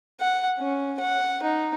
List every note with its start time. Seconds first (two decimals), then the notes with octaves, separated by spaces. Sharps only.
0.20 F#5
0.58 C#4
1.00 F#5
1.43 D#4